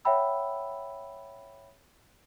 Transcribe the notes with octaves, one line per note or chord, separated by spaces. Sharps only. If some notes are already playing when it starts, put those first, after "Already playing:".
C#5 E5 F#5 G5 B5 E6